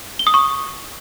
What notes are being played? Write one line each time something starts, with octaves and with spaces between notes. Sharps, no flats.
G7
D#6
C#6